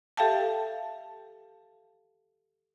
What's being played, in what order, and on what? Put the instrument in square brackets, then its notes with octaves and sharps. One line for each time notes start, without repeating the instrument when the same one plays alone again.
[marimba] G4 A4 E5 F5 G5 A5